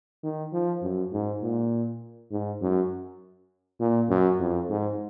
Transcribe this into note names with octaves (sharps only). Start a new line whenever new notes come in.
D#3
F3
F#2
G#2
A#2
G#2
F#2
A#2
F#2
F2
G#2